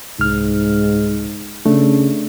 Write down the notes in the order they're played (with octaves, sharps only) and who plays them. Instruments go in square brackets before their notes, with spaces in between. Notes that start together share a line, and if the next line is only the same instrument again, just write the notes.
[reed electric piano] C2 F6 [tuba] G#2
[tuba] C#3 [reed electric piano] A3 D4